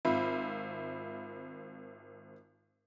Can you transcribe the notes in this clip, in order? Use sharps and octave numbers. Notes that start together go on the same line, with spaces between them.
G#1 C4 F4 E5 B5